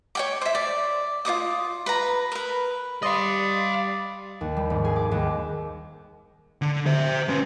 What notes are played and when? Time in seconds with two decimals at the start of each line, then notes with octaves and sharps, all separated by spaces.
0.15 C#5 G5 D6
0.42 C5 E5
0.55 D5
1.25 F4 C#5 D6 D#6
1.86 B4 A#5
2.32 A#4 B4
3.03 G3 D5 D#5 F5 B5 C6 D#6
4.41 D#2
4.57 G3
4.70 G#1
4.84 G#4
4.96 D6
5.11 D#2
6.62 D3
6.87 C5 E5
7.29 C#4 B4